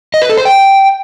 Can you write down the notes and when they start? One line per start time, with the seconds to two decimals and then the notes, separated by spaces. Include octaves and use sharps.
0.14 D#5
0.22 B4
0.30 A4
0.37 C5
0.45 G5